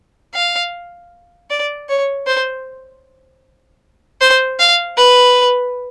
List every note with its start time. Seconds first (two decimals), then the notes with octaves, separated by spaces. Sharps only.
0.35 F5
1.50 D5
1.89 C#5
2.27 C5
4.21 C5
4.59 F5
4.98 B4